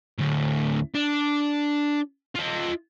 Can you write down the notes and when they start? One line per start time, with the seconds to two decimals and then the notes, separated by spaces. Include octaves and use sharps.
0.18 D2 A2
0.95 D4
2.35 F4 D#5